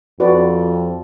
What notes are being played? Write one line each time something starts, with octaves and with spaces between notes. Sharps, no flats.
F2 F#4 B4 D5